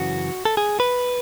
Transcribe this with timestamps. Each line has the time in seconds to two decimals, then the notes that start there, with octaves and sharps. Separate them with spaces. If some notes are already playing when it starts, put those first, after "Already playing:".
Already playing: F#2 C#3 E3 F#4
0.45 A4
0.57 G#4
0.80 B4